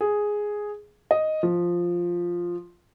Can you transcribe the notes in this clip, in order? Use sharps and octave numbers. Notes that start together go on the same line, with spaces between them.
G#4
D#5
F3